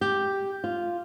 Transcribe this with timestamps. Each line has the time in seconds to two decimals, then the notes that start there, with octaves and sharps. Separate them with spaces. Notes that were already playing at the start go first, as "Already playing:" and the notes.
0.01 G4
0.64 F4